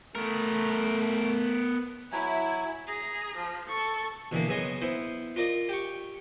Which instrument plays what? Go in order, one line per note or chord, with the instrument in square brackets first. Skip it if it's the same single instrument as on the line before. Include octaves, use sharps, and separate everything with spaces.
[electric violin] A3 [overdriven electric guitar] B3 A#4
[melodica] F#3 G#5 [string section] E4
[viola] G#4 A#5
F3
A4 C#6
[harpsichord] B2 D3 E3 A#3
F#2 C#3 B3 G#4 D#5 C6
B3 E4 C5
F4 A#4 D5 D#5
G4 G5 C#6